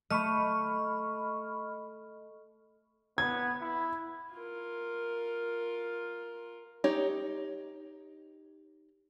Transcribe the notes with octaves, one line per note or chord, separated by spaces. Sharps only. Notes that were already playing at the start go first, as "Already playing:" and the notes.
A3 D#5 B5 C#6 F6
B3 G#6
E4
F4 A#4
D#4 G4 C#5